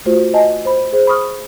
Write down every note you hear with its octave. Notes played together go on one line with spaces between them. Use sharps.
A3 F4 F#4 C5
D#5 G#5 A5
C5 B5
G#4 C5
B5 C#6 D#6 F6